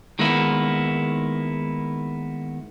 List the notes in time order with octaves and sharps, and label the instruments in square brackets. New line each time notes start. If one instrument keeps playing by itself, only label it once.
[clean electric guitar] D#3 G#3 A#3 B3 E4